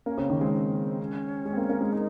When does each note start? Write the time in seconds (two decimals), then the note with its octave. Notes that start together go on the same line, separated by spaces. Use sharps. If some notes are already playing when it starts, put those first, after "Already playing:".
0.06 A#3 C#4
0.18 C#3 C4
0.29 D#3 A#3
0.41 G#3 C4
0.53 C4
0.99 C#4
1.46 G#3
1.53 C4
1.57 A#3
1.70 A#3
1.81 G#3
1.93 D#4